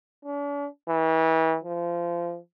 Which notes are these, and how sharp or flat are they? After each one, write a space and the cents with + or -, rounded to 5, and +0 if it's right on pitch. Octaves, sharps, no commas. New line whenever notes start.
D4 -45
E3 -35
F3 -25